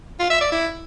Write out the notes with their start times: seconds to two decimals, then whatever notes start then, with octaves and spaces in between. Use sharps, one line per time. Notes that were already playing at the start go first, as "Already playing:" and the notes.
0.19 F4
0.30 E5
0.41 D5
0.52 E4